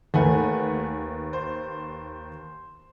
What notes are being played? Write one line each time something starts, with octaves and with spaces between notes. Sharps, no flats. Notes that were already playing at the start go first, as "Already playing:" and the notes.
D#2 A3 B4 F#5 G#5
C5